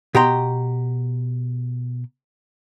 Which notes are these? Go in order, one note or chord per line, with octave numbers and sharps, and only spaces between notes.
B2 G4 G5 A#5 C6